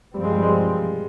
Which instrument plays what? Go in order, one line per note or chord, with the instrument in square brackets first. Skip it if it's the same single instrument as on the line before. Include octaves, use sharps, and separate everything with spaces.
[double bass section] G2 F3 C4 [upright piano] G3
[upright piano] G#3
G3
G#3